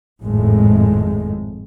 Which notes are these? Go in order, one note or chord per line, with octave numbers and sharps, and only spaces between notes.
G#1 F2 A2 G#3 A3